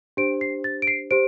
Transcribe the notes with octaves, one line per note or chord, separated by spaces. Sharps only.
D4 G4 C5 D7
C7
A6
D7
C7
G4 C5 D7